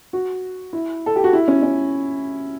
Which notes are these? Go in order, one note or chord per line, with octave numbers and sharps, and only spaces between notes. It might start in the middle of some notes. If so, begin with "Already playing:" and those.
F#4
E4
A4
G4
F#4
E4
C#4
C#4